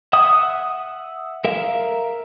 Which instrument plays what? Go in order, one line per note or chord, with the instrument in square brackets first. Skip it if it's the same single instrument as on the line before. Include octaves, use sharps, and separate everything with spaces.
[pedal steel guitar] E5 F#5 D#6
A#4 E5 F5